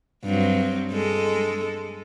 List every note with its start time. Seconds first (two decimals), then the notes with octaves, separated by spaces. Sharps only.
0.24 G2 F#3 C4
0.92 G#3 A4